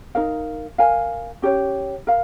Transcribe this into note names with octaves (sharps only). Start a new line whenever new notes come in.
D#4 A#4 F5
A#4 F5 G#5
C#4 G4 C#5
A#4 F5